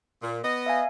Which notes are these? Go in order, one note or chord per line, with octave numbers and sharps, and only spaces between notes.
A#2
B3 D#5
E5 F5 G#5